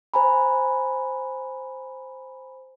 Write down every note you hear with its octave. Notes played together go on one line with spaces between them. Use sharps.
C5 G#5 A#5 B5